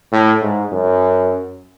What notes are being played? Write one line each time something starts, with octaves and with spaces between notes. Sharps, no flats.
A2
G#2
F#2